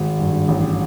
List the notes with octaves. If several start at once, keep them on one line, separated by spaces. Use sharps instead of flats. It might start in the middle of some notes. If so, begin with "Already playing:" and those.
Already playing: G#1
G2
A1